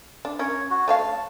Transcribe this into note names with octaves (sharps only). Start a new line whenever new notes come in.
D4
C#4 A#4 C#5
F#4
A3 C#5 F5 A5